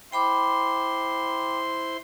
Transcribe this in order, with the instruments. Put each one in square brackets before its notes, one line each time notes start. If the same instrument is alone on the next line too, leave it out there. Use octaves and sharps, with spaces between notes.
[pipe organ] E4 C5 C6 [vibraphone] G5 B5 D6